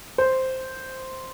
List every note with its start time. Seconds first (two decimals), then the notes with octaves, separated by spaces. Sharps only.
0.18 C5